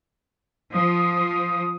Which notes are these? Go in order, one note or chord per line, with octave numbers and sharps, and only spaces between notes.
F3 D#6